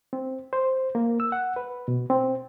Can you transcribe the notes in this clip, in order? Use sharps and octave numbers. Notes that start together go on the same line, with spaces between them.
C4
C5
A#3
E6
F#5
B4
B2
C4